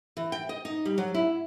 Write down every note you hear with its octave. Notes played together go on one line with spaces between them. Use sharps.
E3
G5
D#5
D#4
G3
F#3
E4